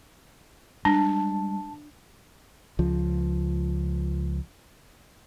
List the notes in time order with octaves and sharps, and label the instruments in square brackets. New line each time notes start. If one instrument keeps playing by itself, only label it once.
[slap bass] G3 G#3 [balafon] D4 [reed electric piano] A5
[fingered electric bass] C#2 F3